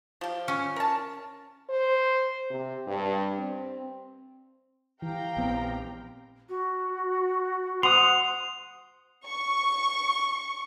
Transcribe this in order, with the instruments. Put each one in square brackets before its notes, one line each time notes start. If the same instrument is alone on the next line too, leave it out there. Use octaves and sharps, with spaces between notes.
[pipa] F3 G4
[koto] C#4
[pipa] A#4 A5
[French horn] C5
C3
G2
C4
[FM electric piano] E3 [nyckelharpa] G4 F5 [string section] G5 A#5
[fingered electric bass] A#1 B3 C4
[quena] F#4
[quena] C5 [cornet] F#5 [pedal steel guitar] C6 D#6 [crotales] F7
[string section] C#6